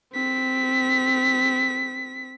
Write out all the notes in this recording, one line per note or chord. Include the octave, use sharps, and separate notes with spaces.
C4 B6